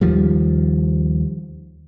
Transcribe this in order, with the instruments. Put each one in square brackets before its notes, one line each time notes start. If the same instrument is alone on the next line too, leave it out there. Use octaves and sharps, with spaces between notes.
[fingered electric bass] D#2 D#3 F3 G3